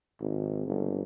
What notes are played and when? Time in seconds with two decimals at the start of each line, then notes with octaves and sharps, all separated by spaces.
0.21 G#1
0.67 G1